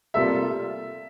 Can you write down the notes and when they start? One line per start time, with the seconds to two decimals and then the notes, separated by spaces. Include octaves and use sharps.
0.14 C3 G3 A#3 F4 A4 E5